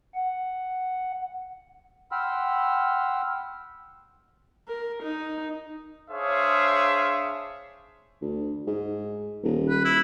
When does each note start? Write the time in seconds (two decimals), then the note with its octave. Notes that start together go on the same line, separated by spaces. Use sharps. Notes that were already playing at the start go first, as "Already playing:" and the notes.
0.15 F#5
2.12 F#5 G5 B5 C6 E6 F6
4.68 A#4
5.03 D#4
6.11 D4 G#4 C5 C#5 E5 F5
8.21 D2
8.67 G#2
9.43 D#1
9.70 B4
9.85 E4